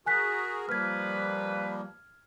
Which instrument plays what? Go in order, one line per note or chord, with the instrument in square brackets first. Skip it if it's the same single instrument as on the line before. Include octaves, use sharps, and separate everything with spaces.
[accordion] F#4 G#4 A#4 [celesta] G#5 F#6 B6
[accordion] F3 G3 A#3 [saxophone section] B4 [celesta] F6 G#6